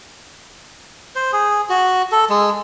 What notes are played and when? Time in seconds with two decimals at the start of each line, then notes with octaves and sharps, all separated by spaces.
1.16 C5
1.33 G#4
1.70 F#4
2.12 A4
2.30 G#3